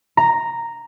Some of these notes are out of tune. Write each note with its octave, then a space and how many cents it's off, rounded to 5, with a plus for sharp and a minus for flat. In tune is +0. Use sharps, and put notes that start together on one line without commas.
A#5 -5